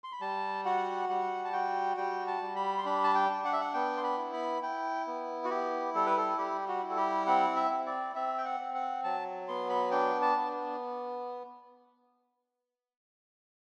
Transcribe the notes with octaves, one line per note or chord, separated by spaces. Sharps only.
C6
B5
G3 A5
F#4 F#5
G3 F#5
A5
F#4 G5
G3 G5
A5
G3
B5
C6
D4 B5
A5
G5
D4
F#5
E5
F#5
B3 G5
C6
B5
E4
B5
E4 G5
B3
F#4
E4 G4
G3 A4
B4
A4
G3 G4
F#4
E4
A4
G4
C4 F#5
E5
C4
D5
C4 E5
G5
F#5
C4
F#5
F#3 A5
B3 C6
B5
D4 G5
A5
B3